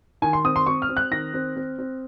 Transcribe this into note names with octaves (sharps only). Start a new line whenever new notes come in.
D#3 G#5
C6
C4 D#6
C6
C4 C#6
F6
C4
F#6
D#3 A#6
C4
C4
C4